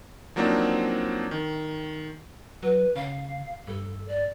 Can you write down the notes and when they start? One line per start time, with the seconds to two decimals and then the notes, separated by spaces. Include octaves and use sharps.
0.36 F3 F#3 A#3 C4 D4 D#4
1.31 D#3
2.63 F#3 B4
2.96 C#3 F5
3.67 G2 A4
4.08 D5